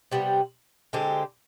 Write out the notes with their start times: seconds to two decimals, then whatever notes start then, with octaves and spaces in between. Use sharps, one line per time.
0.12 C3 G3 B3
0.93 D3 G#3 C4 G4